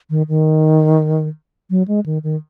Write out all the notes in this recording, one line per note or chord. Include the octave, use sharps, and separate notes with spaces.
D#3
D#3
F#3
G#3
D#3
D#3